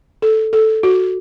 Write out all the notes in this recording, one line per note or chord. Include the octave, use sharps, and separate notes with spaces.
A4
A4
F#4